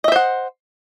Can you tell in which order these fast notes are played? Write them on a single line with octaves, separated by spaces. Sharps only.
D#5 E5 C5 F#5